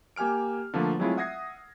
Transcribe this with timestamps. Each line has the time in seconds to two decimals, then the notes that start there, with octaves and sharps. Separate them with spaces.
0.16 A#3 G4 G#5 F6 D7
0.74 D3 F3 A3 A#3 F4 B4
0.99 F#3 G#3 A3 C4 E4 F4
1.17 E5 F#5 D#6 G#6 A#6 C7